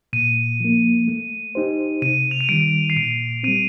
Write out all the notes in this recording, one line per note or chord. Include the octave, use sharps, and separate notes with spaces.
A#2 D#7
F3 A#3
A3
D#4 G4 C5
C3 D#7
F7
D#7
D#3 G3 D7
C7
A#2 D7
G3 C4 D#7